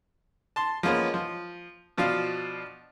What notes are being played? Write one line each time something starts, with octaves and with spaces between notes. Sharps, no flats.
A5 C6
F3 G#3 A#3 B3 C#4
F3
B2 F3 D4 F5